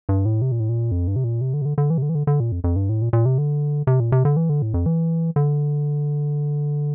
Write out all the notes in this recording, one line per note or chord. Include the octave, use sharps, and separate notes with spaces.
G2
A2
C3
A#2
A2
A#2
F2
G2
C3
A#2
C3
D3
C3
D3
D3
E3
C3
D3
E3
D3
D3
A#2
F2
F2
G2
A2
A#2
A#2
C3
D3
C3
A#2
C3
D3
E3
D3
A2
F2
E3
D3